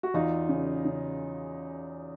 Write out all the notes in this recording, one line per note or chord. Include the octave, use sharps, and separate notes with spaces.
F#4
E2 D#4 F4
C#3
C#3